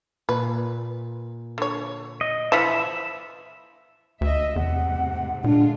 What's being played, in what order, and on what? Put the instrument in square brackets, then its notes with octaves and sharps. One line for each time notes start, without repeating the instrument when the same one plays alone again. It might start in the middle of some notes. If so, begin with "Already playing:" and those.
[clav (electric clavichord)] A#2 [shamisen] B4
[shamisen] D3 C#5
[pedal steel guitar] D#5
[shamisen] E3 F3 [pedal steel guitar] E5 B5
[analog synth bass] D2 [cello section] D#5 E5
[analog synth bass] E2 [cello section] G#2 C3 A3 [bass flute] F#5
[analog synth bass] A#2 [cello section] D3 G#3 F4 [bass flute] D4